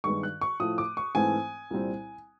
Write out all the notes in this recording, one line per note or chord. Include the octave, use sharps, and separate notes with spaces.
G2 D#3 G#3 B3 C#6
F#6
C#6
A2 F3 A3 D#6
D6
C#6
G#2 E3 A3 C4 G#5
C2 A#2 G3 C4